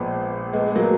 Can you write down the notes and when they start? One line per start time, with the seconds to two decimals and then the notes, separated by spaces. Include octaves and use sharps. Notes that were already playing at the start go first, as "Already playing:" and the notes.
Already playing: A#1 A#2 F3 G#3 B3
0.53 G#3 B3
0.75 F#3 A#3